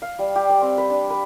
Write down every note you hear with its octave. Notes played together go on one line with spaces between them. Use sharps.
F5
G3
G4
D5
C4
B4
D4
B4